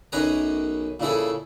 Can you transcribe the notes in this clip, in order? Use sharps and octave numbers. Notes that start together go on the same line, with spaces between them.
B1 F#2 G#4 B4 G#5 A#5
A#2 C#3 E4 G#4 A4